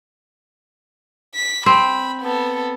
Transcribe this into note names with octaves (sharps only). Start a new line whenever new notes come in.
B6
C4 B5
B3 A4